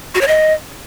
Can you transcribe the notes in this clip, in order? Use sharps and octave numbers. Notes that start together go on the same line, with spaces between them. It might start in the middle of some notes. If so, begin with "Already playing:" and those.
F#4
C#5
D#5